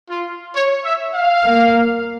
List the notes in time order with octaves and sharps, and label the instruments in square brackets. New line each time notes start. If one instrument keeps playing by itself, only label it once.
[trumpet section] F4
C#5
E5
F5
[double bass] A#3